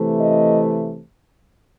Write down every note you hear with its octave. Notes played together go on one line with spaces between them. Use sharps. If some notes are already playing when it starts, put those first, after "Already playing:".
Already playing: C3 E3 A3
D#5